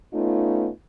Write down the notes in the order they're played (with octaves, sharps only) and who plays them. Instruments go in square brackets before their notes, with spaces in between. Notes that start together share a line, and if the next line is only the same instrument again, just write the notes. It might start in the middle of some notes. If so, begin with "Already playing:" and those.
[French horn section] A3 B3 C#4 D#4 F4